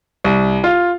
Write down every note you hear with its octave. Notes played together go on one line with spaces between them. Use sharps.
C2
F4